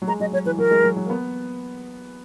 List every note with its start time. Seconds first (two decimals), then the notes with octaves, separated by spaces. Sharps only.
0.02 F#3
0.08 G#3 A#5
0.20 F#3 D#5
0.33 F#3 C#5
0.45 E3 B4
0.58 F#3 A#4
0.71 G#3
0.83 F#3
0.96 F#3
1.06 A#3
1.10 B3